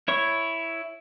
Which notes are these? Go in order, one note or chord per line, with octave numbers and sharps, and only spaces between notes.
E4 C#5 C#6